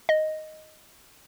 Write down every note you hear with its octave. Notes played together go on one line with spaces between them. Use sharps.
D#5